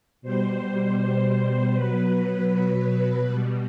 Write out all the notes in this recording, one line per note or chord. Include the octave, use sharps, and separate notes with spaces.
B2 G3 C5
B2 F#3 B4
B2 G3